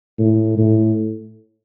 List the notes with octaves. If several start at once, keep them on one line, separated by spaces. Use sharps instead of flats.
A2
A2